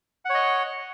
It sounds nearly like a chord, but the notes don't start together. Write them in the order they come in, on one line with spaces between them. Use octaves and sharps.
F#5 C#5 D#5